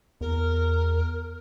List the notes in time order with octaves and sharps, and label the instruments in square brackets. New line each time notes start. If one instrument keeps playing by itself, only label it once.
[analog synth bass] E2 [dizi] A#4